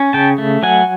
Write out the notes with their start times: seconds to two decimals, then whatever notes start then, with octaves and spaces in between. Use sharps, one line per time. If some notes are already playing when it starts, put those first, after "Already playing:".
Already playing: C#4
0.13 C#3 G5 A5
0.38 A3
0.63 F#3 F#5 G#5